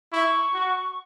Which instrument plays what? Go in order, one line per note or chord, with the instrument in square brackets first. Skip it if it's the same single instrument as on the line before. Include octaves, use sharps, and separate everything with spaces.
[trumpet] E4 [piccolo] C#6
[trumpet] F#4